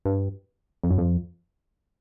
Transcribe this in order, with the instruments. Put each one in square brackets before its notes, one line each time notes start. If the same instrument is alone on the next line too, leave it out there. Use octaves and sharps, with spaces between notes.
[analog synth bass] G2
F2
F#2
F2